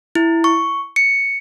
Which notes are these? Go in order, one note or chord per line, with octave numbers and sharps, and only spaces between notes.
E4
C#6
C#7